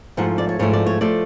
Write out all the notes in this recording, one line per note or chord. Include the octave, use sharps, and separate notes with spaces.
G#2 F3 A3 F#5
D5
C#5
G#2 F3 A3 C#5
D5
C#5
F3 A3 D5